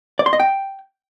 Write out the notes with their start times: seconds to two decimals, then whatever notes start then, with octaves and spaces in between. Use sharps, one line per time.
0.19 D5
0.26 C6
0.33 D#5
0.40 G5